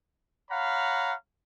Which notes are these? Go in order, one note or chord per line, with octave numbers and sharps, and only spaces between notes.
C#5 F5 F#5 A#5 B5